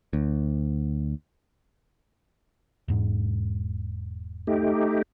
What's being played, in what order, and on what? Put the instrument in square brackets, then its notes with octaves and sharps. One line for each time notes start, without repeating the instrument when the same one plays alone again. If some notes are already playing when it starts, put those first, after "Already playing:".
[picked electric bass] D2
E1 G#2
[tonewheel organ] A3 D#4 G4